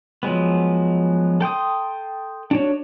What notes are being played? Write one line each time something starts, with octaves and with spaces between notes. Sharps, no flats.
F3 F#3 G#3 B3
A4 G5 C6 D#6
D4 F#4 C#5